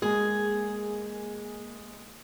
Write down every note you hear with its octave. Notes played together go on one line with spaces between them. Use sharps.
G#3 A#3 G#4